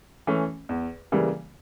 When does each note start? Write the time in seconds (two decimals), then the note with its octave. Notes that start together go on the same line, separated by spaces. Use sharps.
0.27 E3 A3 C#4
0.69 E2
1.12 C#3 E3 G3 A#3